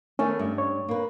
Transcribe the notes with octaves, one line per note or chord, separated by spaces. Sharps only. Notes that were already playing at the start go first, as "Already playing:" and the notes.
D#3 A3 B3 C#4
G2
C#5
A#3 B4